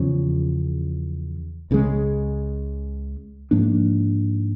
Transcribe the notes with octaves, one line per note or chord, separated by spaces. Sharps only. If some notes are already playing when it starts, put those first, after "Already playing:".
Already playing: E2 C#3 F3
C#2 C#3 F3 G#3
G#2 F3 A#3 D4